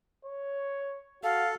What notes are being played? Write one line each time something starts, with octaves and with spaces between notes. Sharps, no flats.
C#5
F#4 A4 F5